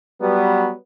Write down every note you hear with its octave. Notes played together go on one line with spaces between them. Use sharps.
F#3 G3 B3